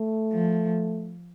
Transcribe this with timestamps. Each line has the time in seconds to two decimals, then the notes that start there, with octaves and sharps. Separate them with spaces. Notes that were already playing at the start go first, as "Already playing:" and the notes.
Already playing: A3
0.33 F3